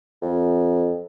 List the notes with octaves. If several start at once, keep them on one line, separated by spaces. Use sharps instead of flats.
F2